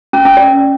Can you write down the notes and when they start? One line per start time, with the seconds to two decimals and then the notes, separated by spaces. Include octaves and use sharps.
0.13 C#4
0.25 C#4
0.37 D5